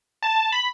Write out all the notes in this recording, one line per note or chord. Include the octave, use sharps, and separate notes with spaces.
A5
B5